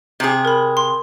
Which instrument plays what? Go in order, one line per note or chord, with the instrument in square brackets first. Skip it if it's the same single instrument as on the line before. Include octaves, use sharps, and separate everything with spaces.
[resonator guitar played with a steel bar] C3 G#4
[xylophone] A#4 B5
C6